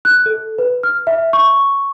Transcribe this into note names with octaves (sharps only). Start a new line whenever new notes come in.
F#6
A4
B4
F6
E5
C#6